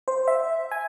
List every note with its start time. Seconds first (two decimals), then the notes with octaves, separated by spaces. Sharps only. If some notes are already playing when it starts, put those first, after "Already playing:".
0.08 C5
0.28 E5
0.71 G#5